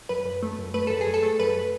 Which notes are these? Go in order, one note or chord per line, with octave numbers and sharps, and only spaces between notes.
F#2 B4
F#2
A3
F#2
A3 B4
F#2 A4
G#4
F#2
A4
A3
F#2 B4